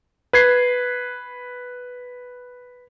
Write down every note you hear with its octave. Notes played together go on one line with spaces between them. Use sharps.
B4 G#6 C7